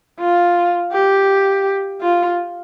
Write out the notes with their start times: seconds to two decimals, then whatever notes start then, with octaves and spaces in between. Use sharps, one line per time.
0.19 F4
0.92 G4
2.01 F4